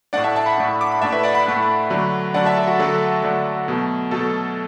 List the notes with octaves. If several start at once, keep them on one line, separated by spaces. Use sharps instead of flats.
A2 A3 D4 D5 F#5
E5 A5
E5 A5
F#5 B5
A2 A3 D4
D6
B5
A2 A3 D4 E5 A5
B4 E5
D5 F#5
F#5 B5
A2 A3 D4
D3 F#3 A3 D4
D3 F#3 A3 D4 D5 F#5
E5 A5
A4
F#4
D3 F#3 A3 D4 A4
D3 F#3 A3 D4
B2 F#3 A3
B2 F#3 A3 A4